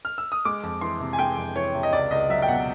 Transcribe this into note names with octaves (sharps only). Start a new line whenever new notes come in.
F6
E6
D#6
G#3 D6
F2
E3 C6
C3
G#5
G#3 G5
F2
E3 C#5
C3
D#5
C#2 D5
C#2 D#5
F#3 E5
G5
B2 F#5